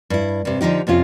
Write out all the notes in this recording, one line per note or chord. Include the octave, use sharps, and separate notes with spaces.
G2 E4
G2 C3
D3 F3 D#4 G4
F2 C3 C#4 F4